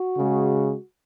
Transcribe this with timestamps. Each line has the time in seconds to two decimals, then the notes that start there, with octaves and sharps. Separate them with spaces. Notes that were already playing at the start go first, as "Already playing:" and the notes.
Already playing: F#4
0.17 C#3 G#3